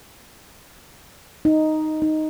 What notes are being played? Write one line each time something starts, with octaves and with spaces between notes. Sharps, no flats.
D#4
D#4